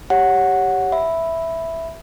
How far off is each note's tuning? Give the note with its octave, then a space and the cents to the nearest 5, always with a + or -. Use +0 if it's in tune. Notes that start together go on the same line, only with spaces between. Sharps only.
G4 +0 C#5 +0 F#5 -5
E5 +0 B5 +0